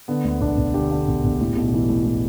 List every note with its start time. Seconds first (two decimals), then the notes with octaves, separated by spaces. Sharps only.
0.08 D3 B3
0.24 D2
0.41 E1 D4
0.57 E1
0.74 D3 G4
0.91 D3
1.07 E1
1.24 E1
1.41 A2
1.56 B1
1.74 E3
1.89 A2
2.05 A2